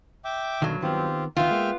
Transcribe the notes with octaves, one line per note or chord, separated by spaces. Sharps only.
E5 G5 D6
B1 G2 D3 D#3 F#3
D#3 B3 C4 F4 G4
D2 D#3 B3 F4 E5 G5 F6
G#3 A#3